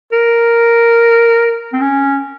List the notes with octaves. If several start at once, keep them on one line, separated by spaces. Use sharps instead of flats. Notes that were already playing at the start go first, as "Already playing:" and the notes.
A#4
C4
C#4